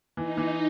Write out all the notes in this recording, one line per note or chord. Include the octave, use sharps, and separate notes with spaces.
E3 D#4
E3